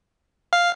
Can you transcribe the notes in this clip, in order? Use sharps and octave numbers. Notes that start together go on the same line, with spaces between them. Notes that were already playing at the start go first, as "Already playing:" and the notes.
F5